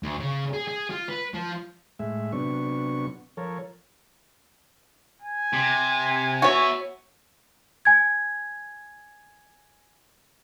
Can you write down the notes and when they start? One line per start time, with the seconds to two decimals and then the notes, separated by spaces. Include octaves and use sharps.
0.03 D2
0.19 C#3
0.53 G#4
0.68 G#4
0.90 F4
1.08 B4
1.34 F3
1.99 A2 G#3 E5
2.32 C3 F#3 B3 D4 C#6
3.37 F3 A4 A#4 C#5
5.22 G#5
5.53 C3
6.42 B3 F#4 C#5 E5
7.85 G#5 G#6